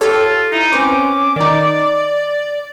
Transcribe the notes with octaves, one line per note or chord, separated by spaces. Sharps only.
F4 G4 A4 C#5
D#4 E4
C4 C#4 B4 C5 D6
D#3 D#4 D5